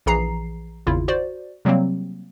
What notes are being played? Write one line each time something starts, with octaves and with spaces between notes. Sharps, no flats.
A#1 E3 G#4 A#5 C7
G#1 E2 C#3 E4 F4
F#4 C5 D5
C3 F#3 G3 A#3 C4